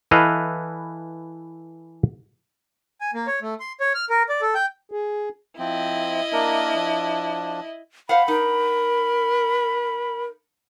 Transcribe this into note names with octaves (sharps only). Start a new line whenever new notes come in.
E3 E4 A4 B4 D#5 F5
G#5
A#3
C#5
A3
C6
C#5
F6
A#4
D5
A4
G5
G#4
F3 C4 E4 D#5
A#3 D4 A#4
F3 D4
C5 F5 F#5 B5
D#4 A#4